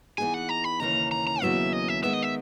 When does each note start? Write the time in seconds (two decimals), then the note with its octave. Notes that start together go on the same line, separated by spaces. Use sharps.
0.18 E3 B3 D#4 G#4 G#5
0.34 F#5
0.49 A#5
0.64 B5
0.80 D#2 C#3 E3 A#3 A#5
1.11 A#5
1.27 A#5
1.42 D#2 C#3 F#3 B3 E4 E5
1.73 D#5
1.88 E5
2.03 D#3 G#3 B3 E5
2.13 D#5
2.23 E5